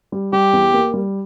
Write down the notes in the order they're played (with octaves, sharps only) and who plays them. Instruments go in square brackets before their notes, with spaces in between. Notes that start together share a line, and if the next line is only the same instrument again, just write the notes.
[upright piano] G3
[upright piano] G3 [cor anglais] G4
[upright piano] E2
A#3
G3